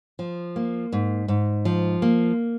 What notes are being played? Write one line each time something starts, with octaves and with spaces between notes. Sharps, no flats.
F3
A#3
G#2
G#2
F3
A#3